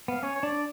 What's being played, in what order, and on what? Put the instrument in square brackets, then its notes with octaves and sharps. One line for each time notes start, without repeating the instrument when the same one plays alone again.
[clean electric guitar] B3 [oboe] F5
[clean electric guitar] C#4 [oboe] C#5
[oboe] C#5
[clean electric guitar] D4 [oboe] D5